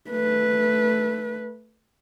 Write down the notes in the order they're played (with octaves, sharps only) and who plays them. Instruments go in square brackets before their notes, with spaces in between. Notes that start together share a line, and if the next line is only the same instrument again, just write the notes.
[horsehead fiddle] A3 B4